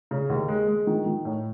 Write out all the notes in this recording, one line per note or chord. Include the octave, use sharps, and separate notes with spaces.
C#3
D#2
G#3
G#3
D#3
D#3
A2